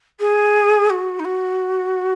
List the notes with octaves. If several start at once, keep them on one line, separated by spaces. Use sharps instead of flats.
G#4
F#4
D#4
F#4